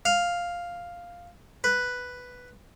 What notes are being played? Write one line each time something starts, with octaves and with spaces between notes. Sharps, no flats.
F5
B4